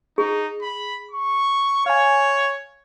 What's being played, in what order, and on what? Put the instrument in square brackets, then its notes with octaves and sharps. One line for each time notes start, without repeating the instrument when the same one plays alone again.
[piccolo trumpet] D#4 [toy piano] G#4
[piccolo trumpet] B5
C#6
[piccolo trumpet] C#5 [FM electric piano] F5 G#5